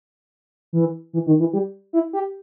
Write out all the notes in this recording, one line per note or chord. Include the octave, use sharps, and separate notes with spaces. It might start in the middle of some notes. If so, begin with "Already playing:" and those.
E3
E3
D#3
E3
G3
E4
G4